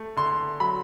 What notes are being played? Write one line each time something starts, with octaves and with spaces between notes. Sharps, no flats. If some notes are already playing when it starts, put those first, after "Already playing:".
Already playing: A3
D3 C6
F#3 B5